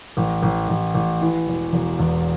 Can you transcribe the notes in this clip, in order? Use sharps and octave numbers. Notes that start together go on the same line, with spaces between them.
A1
A1
A1
A1
E3
E1
E1
E2